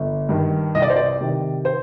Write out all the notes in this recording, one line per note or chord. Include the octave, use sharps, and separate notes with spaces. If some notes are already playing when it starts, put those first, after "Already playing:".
Already playing: G1
G2 D#3
C2 D#5
D5
C5
D5
C3 D#3
C5